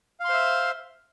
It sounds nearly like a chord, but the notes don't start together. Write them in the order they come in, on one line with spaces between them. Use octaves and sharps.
F5 C6 C5 E5